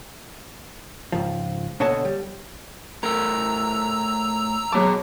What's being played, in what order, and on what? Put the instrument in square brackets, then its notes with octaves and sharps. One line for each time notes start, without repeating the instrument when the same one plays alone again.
[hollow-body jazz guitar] C#2 G#2 F3
B2 D3 C#5 D#5 A5
G3
[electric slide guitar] A2 A4 A#4 [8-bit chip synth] A#5 E6
[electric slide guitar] B2 B3 A5 [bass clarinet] F#3 [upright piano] G#3 D6